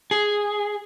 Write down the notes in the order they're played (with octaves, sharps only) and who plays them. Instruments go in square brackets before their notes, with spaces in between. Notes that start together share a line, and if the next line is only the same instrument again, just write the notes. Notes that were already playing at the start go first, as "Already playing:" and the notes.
[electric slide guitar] G#4